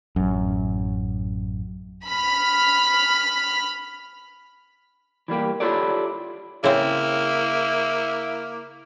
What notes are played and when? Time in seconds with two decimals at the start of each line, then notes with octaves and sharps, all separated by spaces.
0.16 A1 F#2
2.05 B5 F6
5.28 E3 G3 A#3 G4
5.60 E4 F4 G4 A4 C#5 D5
6.64 C#3 A#3 C4 E4